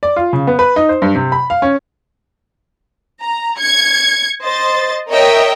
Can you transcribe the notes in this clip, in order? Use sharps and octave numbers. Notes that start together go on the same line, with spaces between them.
D5
F4
C#3
B3
B4
D#4
C5
G2
C3
B5
F5
C#4
A#5
G#6 C#7
C5 D#5 A6
A#4 C#5 D#5 E5 G5